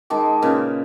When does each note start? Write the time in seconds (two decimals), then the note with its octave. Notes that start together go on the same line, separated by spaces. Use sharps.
0.10 D#3 G#3 A5 D6
0.42 A#2 C#3 B4